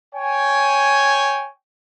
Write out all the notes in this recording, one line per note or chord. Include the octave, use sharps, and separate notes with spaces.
C#5 G5 G#5